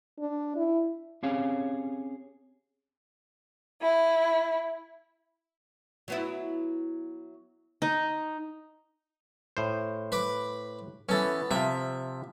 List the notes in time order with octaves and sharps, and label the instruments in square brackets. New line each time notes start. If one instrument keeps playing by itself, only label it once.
[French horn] D4
E4
[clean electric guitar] C4 C#4 G4 G#4 C#5 F5
[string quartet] E4
[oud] F#3 B3 E4
[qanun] D#4
[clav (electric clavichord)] A2 C5
[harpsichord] B4 B5 D6
[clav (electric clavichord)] E3 C#4 [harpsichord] B3 A4
[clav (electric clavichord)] C3 F3 [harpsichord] E5